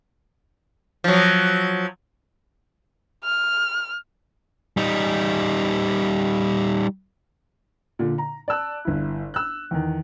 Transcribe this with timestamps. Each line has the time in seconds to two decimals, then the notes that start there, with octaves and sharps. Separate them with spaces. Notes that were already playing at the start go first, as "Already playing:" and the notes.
1.04 F3 F#3
3.25 F6
4.77 G3 D#4
7.99 A#2 D3
8.18 A#5
8.48 D5 A5 E6 F#6
8.85 G1 E4
9.34 E6 F#6
9.71 E2 D#3